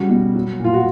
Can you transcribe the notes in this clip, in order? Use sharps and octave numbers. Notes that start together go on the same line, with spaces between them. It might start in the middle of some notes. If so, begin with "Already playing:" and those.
Already playing: C#3 G3 F#4
B2
F#3
A#2
F4
F#4